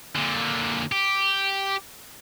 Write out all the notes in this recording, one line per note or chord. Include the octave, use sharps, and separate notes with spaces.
A#2 D3
G4